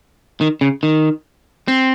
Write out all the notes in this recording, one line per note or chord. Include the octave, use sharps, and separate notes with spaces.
D#3
C#3
D#3
C4